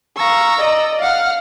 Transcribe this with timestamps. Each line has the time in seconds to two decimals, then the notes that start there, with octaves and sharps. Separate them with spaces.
0.17 F5 A#5 C#6 E6
0.58 D5 D#5
1.02 F5 F#5 F6